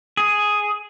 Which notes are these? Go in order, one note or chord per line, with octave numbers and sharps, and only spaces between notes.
G#4